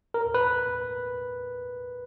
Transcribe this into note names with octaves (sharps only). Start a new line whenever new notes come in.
A#4
B4